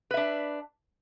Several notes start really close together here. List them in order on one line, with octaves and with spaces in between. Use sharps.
B4 E5 D4